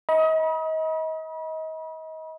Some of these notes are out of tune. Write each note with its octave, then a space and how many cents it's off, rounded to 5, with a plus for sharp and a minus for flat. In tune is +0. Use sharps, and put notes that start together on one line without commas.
D#5 +30 B5 -40